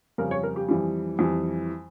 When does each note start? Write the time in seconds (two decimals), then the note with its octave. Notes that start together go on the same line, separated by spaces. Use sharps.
0.18 F2 C#3 G3 A#4
0.31 C#5
0.43 A#4
0.56 G4
0.68 F2 E3 G3
1.19 F2 E3 G3